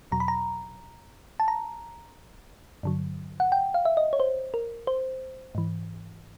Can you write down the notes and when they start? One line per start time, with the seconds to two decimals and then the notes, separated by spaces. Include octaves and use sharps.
0.12 E2 B2 F#3 A#5
0.20 B5
0.28 A#5
1.40 A5
1.48 A#5
2.83 G2 D3 F#3
3.40 F#5
3.52 G5
3.74 F5
3.85 E5
3.97 D#5
4.13 C#5
4.20 C5
4.54 A#4
4.87 C5
5.55 G#2 E3